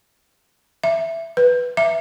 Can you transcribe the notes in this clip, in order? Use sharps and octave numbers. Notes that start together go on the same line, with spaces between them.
E5
B4
E5